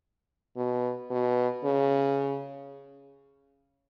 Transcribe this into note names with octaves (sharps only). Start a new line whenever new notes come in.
B2
B2
C#3